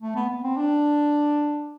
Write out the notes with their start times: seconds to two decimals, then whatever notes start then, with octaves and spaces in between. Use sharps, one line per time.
0.02 A3
0.16 B3
0.30 B3
0.44 C4
0.57 D4